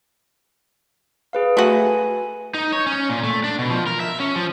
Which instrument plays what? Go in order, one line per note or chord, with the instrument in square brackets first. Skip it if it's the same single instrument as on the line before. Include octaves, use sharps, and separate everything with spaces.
[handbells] G#4 B4 F5
[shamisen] A3 F#4 [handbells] B4 G#5
[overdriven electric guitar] D#4
C#5
C#4
A#2
A3
D4
B2
F3
A#4
E5
C#4
F3